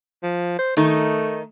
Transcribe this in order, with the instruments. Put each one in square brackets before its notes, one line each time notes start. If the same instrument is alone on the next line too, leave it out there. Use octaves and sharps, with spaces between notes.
[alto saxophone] F3
C5
[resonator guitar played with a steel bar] D#3 D#4 [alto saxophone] A3